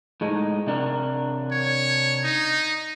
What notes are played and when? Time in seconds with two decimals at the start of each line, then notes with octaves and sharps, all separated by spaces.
0.21 A2 G#3 D#4
0.67 C3 D4 A#4
1.52 C#5
2.24 D#4